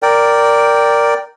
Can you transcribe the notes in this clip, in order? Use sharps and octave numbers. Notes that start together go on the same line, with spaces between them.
A#4 D5 G5